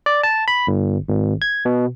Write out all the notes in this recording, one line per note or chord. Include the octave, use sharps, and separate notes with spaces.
D5
A5
B5
G1
G#1
G#6
B2